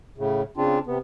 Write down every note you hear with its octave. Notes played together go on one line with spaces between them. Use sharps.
A2 C#3
C#3 C4 D4 F4
C3 B3